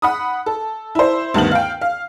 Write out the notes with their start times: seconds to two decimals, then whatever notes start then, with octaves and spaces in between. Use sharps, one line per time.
0.02 F#5 B5 D#6
0.46 A4
0.95 E4 C5
1.34 D2 G2 D#3 B3 F#7
1.51 F5 G5
1.81 F5